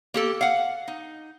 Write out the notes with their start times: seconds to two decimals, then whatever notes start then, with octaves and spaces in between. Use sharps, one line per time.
0.14 A#3 G4 A4
0.41 F5 F#5
0.88 D#4